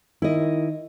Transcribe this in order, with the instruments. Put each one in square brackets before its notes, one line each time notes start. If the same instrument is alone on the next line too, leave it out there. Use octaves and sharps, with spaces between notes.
[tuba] D#3 [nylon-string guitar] E4 D#5